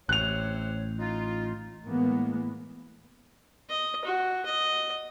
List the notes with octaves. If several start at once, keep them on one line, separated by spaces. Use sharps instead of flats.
A1 C3 C5 C#5 F#6 F7
D#4 F4
A2 E3 G#3 A#3 B3
D#5
F#4
D#5